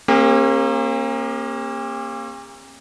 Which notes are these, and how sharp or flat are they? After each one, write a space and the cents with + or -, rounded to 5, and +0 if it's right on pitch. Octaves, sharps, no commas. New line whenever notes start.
A#3 +0 C#4 -45 G4 +45